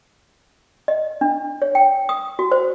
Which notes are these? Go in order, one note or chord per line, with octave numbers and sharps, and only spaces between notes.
D#5
D4
C#5
G5
D#6
F#4
C5